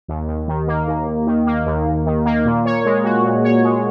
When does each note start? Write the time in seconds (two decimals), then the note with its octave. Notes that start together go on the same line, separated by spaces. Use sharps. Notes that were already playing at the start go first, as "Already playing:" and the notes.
0.08 D#2
0.28 D#2
0.48 D#3
0.67 A#3
0.87 D#2
1.07 D#2
1.27 D#3
1.46 A#3
1.66 D#2
1.87 D#2
2.06 D#3
2.26 A#3
2.45 A#2
2.65 C#5
2.85 G#3
3.04 F#4
3.24 A#2
3.44 C#5
3.64 G#3